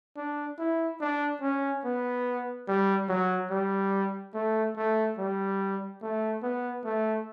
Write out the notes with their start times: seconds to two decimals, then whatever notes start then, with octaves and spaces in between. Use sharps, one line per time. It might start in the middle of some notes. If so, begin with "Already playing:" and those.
0.17 D4
0.59 E4
1.01 D4
1.42 C#4
1.84 B3
2.68 G3
3.09 F#3
3.51 G3
4.34 A3
4.76 A3
5.18 G3
6.02 A3
6.43 B3
6.85 A3